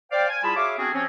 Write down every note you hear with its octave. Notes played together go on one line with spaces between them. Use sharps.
C5 D5 F5 G5
G#5
G3 E4 F4 G#4 A5 B5
F#4 G#4 C#5 E5 F5 D6
B3 C4 D4 F#4 G#4
F3 C4 C#4